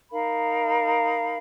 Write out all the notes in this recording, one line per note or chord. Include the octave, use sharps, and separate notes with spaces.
D#4 A#4 F5 B5